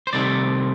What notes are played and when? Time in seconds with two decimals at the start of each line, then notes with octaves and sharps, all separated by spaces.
0.07 C5
0.13 C2 C3 D#3 A3 D5